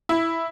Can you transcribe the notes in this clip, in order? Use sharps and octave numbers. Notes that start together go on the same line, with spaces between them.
E4